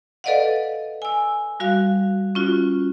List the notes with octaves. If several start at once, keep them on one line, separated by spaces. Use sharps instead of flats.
A4 B4 D5 D#5 F5 F#5
G#5 E6
G3 F#4 F5 F#6
C#4 F4 F#4